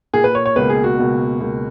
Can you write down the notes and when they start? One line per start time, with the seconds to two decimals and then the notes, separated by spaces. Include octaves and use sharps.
0.13 A#2 A#3 G#4
0.24 B4
0.35 C#5
0.46 C#5
0.56 C#2 B2 A#3 B4
0.70 G#4
0.84 F#4
0.98 C#2 B2 A#3
1.40 C#2 B2 A#3